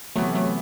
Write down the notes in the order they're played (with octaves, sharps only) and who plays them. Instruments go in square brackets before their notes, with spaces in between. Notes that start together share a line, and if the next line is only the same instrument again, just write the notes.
[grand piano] C3 E3 B3 [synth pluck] F#3 A3
[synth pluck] F#3 A3